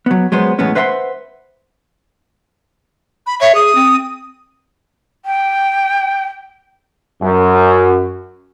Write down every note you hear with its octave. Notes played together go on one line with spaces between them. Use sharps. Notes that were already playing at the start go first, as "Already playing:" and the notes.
F#3 B3
F#3 G#3 B3 C5
E2 A2 G#3 B3 C#4
B4 C5 E5 F#5 G#5 C6
B5
C#5 E5
G#4 D#6
C4
G5
F#2